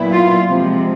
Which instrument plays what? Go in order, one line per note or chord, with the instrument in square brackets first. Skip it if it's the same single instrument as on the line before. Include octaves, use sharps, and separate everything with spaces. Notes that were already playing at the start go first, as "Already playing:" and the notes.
Already playing: [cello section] A#2 F#3 B3 E4
F4
C3 F3 G#3